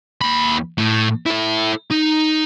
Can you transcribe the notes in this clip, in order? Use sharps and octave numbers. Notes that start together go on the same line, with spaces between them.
D#2 B5
A2
E4 A4
D#4